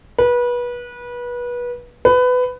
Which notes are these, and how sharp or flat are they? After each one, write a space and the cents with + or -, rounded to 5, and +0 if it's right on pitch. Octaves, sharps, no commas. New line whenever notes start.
B4 -25
B4 +20